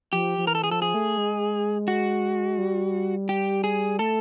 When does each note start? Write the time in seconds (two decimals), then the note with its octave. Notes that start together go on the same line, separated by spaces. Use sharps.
0.13 F3 G4
0.38 F3
0.47 E3 A#4
0.55 A4
0.64 G#4
0.71 F3 A4
0.82 G#4
0.94 A3
1.18 G#3
1.88 F#4
2.58 G3
3.29 G4
3.64 G#4
3.99 A3 A4